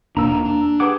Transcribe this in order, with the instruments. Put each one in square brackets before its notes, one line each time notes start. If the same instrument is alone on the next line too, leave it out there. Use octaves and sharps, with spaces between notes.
[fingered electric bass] D#1 B2 D4 [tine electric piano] D#2 A#3 E6 [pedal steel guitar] A#5
[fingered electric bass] D4
[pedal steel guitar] G4 G#4 D6 [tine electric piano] B4 F#5